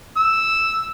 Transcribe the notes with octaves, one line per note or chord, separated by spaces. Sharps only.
E6